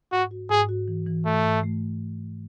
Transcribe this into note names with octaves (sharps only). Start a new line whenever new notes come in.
G#2 F#4
F#4
G#2 G#4
F#4
E3
E3
G#2 A3
G#2
A3